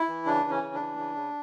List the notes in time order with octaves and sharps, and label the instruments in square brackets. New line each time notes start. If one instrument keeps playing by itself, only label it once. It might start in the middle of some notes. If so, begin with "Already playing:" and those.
Already playing: [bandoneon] E4
E3
C#3 D4
E3
C#4
C#3
D4
E3
C#3
C#3